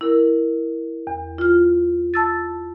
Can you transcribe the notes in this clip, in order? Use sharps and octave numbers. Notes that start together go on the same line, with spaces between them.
E4 A#4
E2
F4 F6
A5 E6 A6